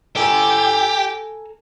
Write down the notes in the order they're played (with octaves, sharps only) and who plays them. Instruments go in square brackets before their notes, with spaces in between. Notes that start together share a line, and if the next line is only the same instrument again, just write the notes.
[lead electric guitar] G4 [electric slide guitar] A4 G#5 A#5